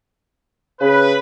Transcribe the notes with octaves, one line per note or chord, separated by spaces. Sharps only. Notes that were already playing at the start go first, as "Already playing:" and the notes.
C#3 B4